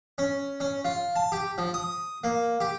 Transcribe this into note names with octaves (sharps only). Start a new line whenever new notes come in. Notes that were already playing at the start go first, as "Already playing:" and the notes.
C#4
C#4
F4
A5
G4
F3
D#6
A#3
G4